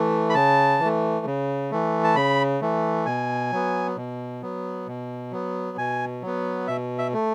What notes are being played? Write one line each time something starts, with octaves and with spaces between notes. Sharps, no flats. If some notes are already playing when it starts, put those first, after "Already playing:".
Already playing: E3 A3
B5
C#3 A5
E3
A3
C#3
E3 A3
A5
C#3 B5
E3 A3
B2 G#5
F#3 B3
B2
F#3 B3
B2
F#3 B3
B2 G#5
F#3 B3
B2 E5
E5
A3